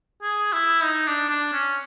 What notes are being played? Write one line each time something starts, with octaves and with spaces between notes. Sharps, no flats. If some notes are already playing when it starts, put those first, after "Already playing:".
G#4
E4
D#4
D4
D4
C#4